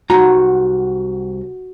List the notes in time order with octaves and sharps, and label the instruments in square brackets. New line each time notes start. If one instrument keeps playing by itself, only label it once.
[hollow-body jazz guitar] C2 D#4 A#5 [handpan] F#4